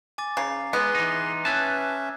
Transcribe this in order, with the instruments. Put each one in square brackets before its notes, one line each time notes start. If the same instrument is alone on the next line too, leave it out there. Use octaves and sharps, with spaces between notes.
[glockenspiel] G#5 D6 A6
[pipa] C#3 [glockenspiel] A#5 C7
[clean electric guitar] G#3 [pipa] B3 [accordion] G#4 C6 [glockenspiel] F#6
[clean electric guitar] E3 D#4
[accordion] C#4 E5 [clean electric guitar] B4 A5 [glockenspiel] F#6 G#6